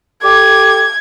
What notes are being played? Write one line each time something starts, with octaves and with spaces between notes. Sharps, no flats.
G4 A4 D6 G#6